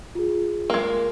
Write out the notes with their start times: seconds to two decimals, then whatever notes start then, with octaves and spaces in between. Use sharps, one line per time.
0.15 F4 G#4
0.70 G#3 A#3